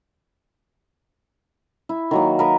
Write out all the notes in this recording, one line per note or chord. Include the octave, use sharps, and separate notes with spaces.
E4
D#3 F#3 A#3
A#4 B4 D#5